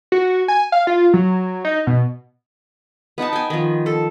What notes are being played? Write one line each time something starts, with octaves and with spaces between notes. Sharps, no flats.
F#4
G#5
F5
F4
F#3
D#4
B2
B3 D#4 F#5 A5
G5 G#5
D#3 F3
A4